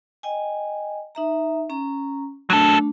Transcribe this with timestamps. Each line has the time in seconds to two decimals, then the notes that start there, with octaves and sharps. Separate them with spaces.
0.23 D#5 G5 G#5
1.15 D#4 E5 A#5
1.70 C#4 A#5
2.50 F#3 A3 D4 A4 A5